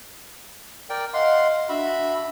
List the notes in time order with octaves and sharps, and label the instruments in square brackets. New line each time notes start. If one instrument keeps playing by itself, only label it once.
[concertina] A#4 D5 G5
[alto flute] D#5 [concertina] F5 F#5 C6
[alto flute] D4 [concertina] F#4 E5 B5